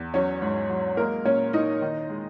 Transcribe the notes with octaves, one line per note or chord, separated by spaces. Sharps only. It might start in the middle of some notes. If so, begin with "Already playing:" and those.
Already playing: E2
F#3 C#4 C#5
G#2
F#3
G#3 A#3 A#4
A#2 C#4 C#5
A#2 D#4 D#5
D#3
G#3